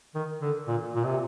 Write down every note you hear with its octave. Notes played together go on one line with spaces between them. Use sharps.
D#3
D3
A#2
A#2
C3